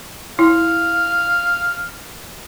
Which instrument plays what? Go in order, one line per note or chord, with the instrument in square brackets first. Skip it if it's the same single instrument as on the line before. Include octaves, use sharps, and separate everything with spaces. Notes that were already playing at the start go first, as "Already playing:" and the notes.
[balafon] E4 [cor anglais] F5